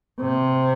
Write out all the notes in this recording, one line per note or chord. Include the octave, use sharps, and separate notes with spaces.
C3